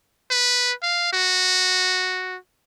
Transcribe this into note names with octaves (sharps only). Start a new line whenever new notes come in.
B4
F5
F#4